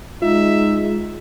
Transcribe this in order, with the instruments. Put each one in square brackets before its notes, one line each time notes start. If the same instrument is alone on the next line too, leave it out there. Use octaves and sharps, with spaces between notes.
[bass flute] G#3 [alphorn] D#4 [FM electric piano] F4 [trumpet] E5